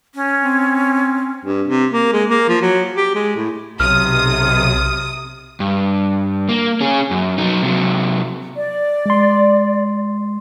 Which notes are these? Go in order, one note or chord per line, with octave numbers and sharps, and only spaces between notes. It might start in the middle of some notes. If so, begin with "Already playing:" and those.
C#4
C4
G2
C3
A#3
G#3
A#3
F3
F#3
G4
G#3
A2
B1 C3 D#6 F6
G2
A#3
C#4 G#4
F#2
F#3 D#4
C3 F#3
D5
G#3 C6